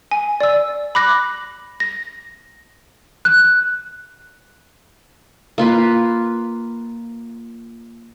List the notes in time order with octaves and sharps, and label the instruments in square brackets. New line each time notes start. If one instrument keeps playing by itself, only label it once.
[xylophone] G#5
D5 E6
B5 D6 F#6 A#6
A#6
[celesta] F#6
[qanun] A#3 F4 B4